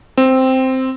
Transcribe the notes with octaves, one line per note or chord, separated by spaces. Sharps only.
C4